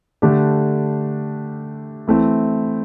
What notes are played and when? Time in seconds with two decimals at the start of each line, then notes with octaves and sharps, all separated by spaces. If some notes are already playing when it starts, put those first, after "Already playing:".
0.22 D3 A3 D4 G4
2.07 E3 A3 C4